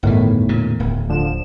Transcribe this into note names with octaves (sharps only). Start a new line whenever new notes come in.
G1 E2 A2 D#3 E3
A#2 C#3
D1
D3 F3 E7